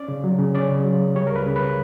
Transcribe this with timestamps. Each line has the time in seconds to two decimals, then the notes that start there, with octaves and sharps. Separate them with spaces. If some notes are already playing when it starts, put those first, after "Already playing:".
Already playing: C#4 D5
0.08 C#3
0.24 F#3
0.39 C#3
0.54 C#4 D5
0.69 C#3
0.85 F#3
1.00 C#3
1.15 G3 C#5
1.27 A#4
1.31 C#2 B4
1.46 C#3
1.56 B4